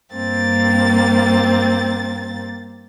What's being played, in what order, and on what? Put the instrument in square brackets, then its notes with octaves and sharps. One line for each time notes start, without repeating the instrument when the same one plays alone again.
[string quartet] G2 A#3 C4 A6